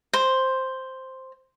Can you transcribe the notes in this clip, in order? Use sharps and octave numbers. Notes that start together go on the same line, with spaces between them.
C5